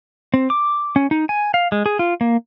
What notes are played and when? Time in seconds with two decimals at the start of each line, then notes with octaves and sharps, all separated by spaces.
0.34 C4
0.50 D6
0.96 C#4
1.11 D#4
1.29 G#5
1.54 F5
1.72 G#3
1.86 G#4
1.99 F4
2.21 A#3